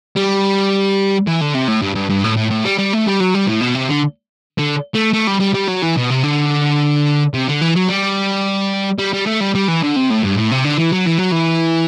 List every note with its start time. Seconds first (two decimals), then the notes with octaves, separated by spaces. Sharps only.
0.16 G3
1.27 E3
1.41 D3
1.54 C3
1.68 A2
1.82 G2
1.95 G2
2.09 G2
2.24 A2
2.37 A2
2.51 A2
2.64 G3
2.78 G3
2.93 A3
3.06 G3
3.20 F#3
3.34 G3
3.47 A2
3.61 B2
3.75 C3
3.89 D3
4.58 D3
4.94 A3
5.13 A3
5.27 G3
5.40 G3
5.54 G3
5.68 F#3
5.83 E3
5.96 B2
6.10 C3
6.23 D3
7.34 C3
7.48 D3
7.61 E3
7.75 F#3
7.88 G3
8.99 G3
9.14 G3
9.26 A3
9.41 G3
9.55 G3
9.68 E3
9.82 D3
9.96 C3
10.10 A2
10.23 G2
10.37 A2
10.52 C3
10.65 D3
10.78 E3
10.93 F#3
11.07 E3
11.19 F#3
11.32 E3